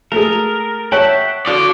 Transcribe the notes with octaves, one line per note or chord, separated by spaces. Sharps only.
A3 G#4 A#4
C#5 E5 F#5 G5 A5
F4 F#4 A4 D5